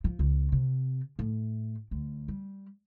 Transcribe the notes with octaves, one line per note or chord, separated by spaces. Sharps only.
F3
C#2
C3
A2
D2
G3